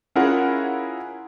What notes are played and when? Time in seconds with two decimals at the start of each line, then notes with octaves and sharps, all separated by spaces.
0.15 C#4 E4 F4 G#4 A#4 F#5